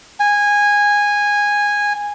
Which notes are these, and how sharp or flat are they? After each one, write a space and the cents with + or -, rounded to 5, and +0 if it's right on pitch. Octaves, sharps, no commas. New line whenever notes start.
G#5 -15